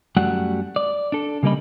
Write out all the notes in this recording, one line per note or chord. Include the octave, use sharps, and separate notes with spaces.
F#2 G3 A3 F#4 F#5
D5
D4 A4
C#3 G3 A#3 G4 D#5 B5